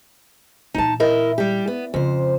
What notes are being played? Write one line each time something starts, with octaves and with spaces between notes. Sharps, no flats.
A#2 E3 D#4 A5
E4 A#4 D#5
G3 G4
B3
F2 C#3 C5